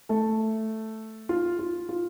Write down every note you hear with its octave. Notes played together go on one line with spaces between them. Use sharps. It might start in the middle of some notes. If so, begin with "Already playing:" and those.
A3 A4
F4
F4
F4